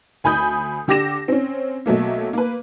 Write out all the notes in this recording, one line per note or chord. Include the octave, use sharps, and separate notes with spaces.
D2 G#5 B5 D#6 G6
D3 G4 D6 A#6 E7
C4 C#4
B1 F#3 A3 A#3
A#3 B4